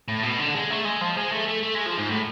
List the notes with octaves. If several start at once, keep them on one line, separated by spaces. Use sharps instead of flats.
A2
B2
D3
G#3
A3
G#3
F3
G#3
A3
A3
A3
G#3
F3
G#2
A2